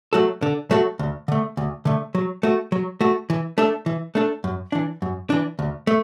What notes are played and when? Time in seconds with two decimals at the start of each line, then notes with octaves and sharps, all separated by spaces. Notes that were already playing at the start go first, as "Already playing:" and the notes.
0.13 F#3 A3 F#4 A4
0.42 D3
0.71 F#3 A3 F#4 A4
0.99 D2
1.28 D3 A3
1.57 D2
1.85 D3 A3
2.15 F#3
2.43 A3 F#4
2.72 F#3
3.01 A3 F#4
3.30 E3
3.58 A3 D4 A4
3.86 E3
4.15 A3 D4 A4
4.44 F#2
4.72 E3 D4
5.02 F#2
5.30 E3 D4
5.59 D2
5.87 A3